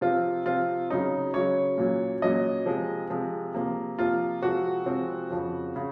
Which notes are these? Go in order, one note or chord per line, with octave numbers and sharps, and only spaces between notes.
C3 F3 C4 F4
C3 F3 C4 F4
C#3 F#3 C#4 D#4
C#3 F#3 C#4 C#5
A#2 F#3 C#4
A#2 F#3 C#4 D#5
C3 F3 G#3
C3 F3 G#3
C3 F3 A#3
C3 F3 A#3 F4
C3 F3 G#3 C4 F#4
C3 F3 G#3 C4
F2 C#3 F3
C#3